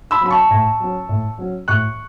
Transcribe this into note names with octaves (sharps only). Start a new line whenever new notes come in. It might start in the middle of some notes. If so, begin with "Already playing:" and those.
B5 E6
F#3 C#4 B5
A5 C#6
A2
F#3 C#4
A2
F#3 C#4
A2 C#6 F#6